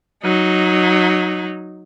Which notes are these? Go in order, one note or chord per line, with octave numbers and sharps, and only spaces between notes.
F#3 D#4